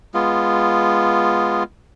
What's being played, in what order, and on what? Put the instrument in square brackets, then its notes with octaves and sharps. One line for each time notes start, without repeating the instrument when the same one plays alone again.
[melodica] G#3 B3 F4